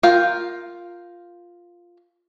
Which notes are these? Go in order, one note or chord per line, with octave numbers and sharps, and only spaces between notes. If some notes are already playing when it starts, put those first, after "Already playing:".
F4 A#4 F5 G5